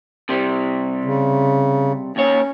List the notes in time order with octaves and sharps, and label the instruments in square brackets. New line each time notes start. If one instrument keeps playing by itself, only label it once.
[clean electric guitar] C3 G3
[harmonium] C#3
[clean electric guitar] D#2 C#5 [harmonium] C#4